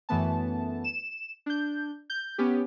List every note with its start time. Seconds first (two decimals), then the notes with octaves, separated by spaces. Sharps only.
0.09 F#2 E3 A3 B3 A5
0.84 E7
1.46 D4 G6
2.10 G6
2.38 B3 C#4 G4